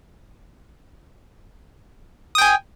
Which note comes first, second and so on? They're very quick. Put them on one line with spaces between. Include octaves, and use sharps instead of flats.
D#6 G5 G#5